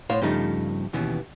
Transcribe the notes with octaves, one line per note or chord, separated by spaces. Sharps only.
A2 C5 C#5 F5 F#5 C6
G2 C#3 F3 A3 D#4
D#2 B2 E3 B3 C#4